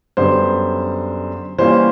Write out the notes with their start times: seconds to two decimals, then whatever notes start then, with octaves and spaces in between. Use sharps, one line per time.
0.17 F#2 D3 G3 B3 C5
1.58 E3 G3 A#3 C#4 F4 C5